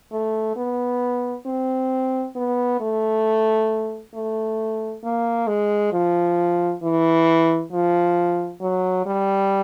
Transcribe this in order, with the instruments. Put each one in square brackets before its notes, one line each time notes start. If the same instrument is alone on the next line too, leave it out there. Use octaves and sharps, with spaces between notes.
[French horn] A3
B3
C4
B3
A3
A3
A#3
G#3
F3
E3
F3
F#3
G3